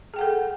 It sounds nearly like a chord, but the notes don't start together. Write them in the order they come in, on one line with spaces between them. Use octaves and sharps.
G#4 G5 F#5 A4